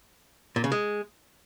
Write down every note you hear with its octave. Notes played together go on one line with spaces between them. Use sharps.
A#2
C#3
G#3